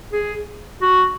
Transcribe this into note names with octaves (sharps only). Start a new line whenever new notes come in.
G#4
F#4